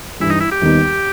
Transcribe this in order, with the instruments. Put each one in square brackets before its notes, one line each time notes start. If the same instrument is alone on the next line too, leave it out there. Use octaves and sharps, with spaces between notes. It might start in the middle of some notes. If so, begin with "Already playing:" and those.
[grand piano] G2 E3 G3 [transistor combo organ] E4
[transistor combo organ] D#4
E4
G4
[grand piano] D#2 D#3 G3 B3 D#4